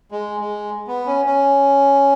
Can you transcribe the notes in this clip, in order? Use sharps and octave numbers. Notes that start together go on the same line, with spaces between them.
G#3
G#3
B3
C#4
C#4